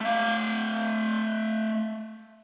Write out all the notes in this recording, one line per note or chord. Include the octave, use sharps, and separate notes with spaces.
A3 F5